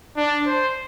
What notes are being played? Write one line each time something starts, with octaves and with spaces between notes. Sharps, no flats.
D4
C5